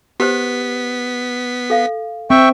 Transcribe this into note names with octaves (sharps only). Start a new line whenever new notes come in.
B3 G4 B4 C5 B6
A4 F5
C4 E5 G5 C#6